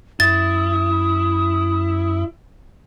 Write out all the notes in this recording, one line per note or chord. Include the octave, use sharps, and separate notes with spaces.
F#2 E4 D#6 A6